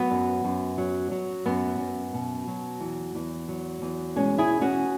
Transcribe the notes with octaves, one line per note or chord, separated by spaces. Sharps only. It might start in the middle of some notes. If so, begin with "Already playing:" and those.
Already playing: F#3 B3
F#2
F#2
F#3
F#3
F#2 B3
F#2
B2
F#3
E2
E2
F#3
E2
B2 G#3 C#4
E4 G#4
E2
C#4 F#4